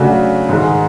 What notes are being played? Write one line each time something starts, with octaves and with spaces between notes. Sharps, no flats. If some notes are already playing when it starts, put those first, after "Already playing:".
Already playing: C#3 F#3 A3 D4 F#4
G#2 D#3 G#3